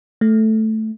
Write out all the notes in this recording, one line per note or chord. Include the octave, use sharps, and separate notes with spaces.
A3